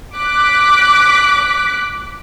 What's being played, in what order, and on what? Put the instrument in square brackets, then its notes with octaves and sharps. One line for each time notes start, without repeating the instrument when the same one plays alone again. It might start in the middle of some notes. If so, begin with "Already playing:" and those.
[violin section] D6 F#6 B6